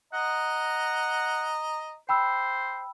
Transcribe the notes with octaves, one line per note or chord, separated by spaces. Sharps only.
D#5 F#5 A#5
C5 G5 B5 E6